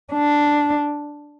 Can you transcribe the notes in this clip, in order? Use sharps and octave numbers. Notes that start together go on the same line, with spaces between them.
D4